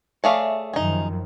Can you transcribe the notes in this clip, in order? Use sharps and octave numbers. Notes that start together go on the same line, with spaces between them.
A3 G#4 C#5 D5 E5 F5
F#2 D#3 F3 D#4 G#4